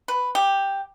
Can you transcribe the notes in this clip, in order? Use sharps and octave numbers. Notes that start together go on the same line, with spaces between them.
B4
G4